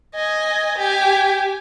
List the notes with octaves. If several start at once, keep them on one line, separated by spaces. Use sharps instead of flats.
D#5 G#5
G4 G#5